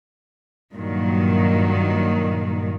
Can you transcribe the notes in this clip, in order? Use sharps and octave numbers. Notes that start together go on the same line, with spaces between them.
G2 A#2 D#3 F#3